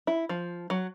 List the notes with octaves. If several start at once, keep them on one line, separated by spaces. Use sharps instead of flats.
E4
F3
F#3